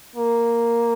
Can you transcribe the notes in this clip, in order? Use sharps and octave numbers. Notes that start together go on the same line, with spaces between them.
A#3